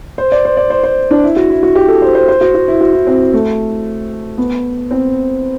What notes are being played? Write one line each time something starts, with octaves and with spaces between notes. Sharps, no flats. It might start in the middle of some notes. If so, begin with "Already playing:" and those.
C5
D5
C5
D5
C5
C5
D4
E4
F#4
E4
F#4
G4
A4
C5
C5
C5
F#4
F#4
E4
F#4
E4
C4
A3
B3
C4